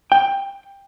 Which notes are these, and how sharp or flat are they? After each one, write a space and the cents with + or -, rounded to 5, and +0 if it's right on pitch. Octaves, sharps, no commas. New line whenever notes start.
G5 +15